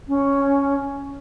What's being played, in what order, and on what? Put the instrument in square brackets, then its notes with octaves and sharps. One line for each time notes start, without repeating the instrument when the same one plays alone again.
[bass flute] C#4